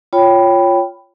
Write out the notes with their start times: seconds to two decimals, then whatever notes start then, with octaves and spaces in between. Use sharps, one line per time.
0.13 F4 C#5 G5 B5